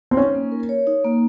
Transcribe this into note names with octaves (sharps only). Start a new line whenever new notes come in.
C4
C#4 D#4
A#3
A#4
C#5
D#4
A#3